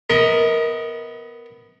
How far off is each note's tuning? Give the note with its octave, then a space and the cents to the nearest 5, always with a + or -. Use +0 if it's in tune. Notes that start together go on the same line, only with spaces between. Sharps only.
B3 +5 A#4 +0 D#5 +40